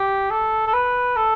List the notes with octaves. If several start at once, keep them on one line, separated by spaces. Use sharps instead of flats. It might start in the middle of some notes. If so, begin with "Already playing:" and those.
Already playing: G4
A4
A4
B4
A4